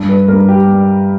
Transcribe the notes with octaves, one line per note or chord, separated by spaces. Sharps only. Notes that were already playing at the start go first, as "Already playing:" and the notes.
Already playing: G2
B4
G2 A#4
G4
G3